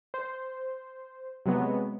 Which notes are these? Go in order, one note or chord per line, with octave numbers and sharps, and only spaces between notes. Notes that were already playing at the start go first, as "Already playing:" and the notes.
C5
C3 F#3 G#3 B3